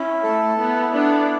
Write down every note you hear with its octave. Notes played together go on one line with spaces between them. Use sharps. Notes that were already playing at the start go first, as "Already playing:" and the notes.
Already playing: C#4 E4
A3 A4
B3 E4
B3 D4 A4